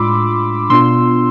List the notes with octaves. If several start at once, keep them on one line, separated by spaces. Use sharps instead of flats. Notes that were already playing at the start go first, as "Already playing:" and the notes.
Already playing: A2 G#3 D4 F4 B5 C6 D6 E6
B2 B3 D4 F4 C6 E6